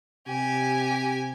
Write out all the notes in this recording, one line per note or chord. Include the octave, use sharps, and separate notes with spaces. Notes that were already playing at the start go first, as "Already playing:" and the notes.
C3 G4 G#5